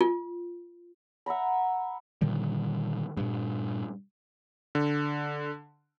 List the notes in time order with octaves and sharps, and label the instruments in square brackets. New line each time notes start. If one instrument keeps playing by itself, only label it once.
[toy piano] F4
[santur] E5 F#5 A#5 B5
[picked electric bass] A#2 D3 D#3 G3
G2 A#2
[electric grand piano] D3